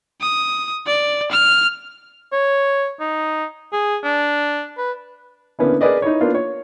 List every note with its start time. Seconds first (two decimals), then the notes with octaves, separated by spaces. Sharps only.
0.21 D#6
0.87 D5
1.31 F6
2.32 C#5
3.00 D#4
3.73 G#4
4.04 D4
4.77 B4
5.59 D3 A#3 B3 C#4 E4
5.81 G#4 A#4 B4 D5 D#5
6.02 D#4 E4 C#5
6.21 A#3 B3 D4 F4
6.35 C#5